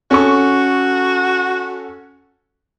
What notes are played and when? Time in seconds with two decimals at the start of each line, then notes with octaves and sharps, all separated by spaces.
0.11 C#4 F#4 A4 C#6